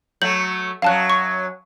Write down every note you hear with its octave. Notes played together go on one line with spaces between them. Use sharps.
F#3 A3 G6 F#7
F#2 F#3 F5 A5 F#6
C#6